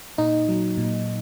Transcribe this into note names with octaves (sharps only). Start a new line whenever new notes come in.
A#2 D#4
F#3
A#2